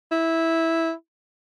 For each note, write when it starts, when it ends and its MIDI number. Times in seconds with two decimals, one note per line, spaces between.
0.12 0.92 64